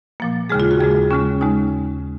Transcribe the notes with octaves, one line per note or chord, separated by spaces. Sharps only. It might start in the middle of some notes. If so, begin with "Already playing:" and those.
A#2 F3 A#3
D#2 C#3 G#3 G#4
F4
F#4
D#2 C#3 G#3 G#4
F4
D#2 C#3 G#3 C#4
D#2 C#3 G#3 D#4